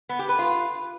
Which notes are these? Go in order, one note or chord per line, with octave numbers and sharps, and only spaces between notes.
B3
G4
B4
F4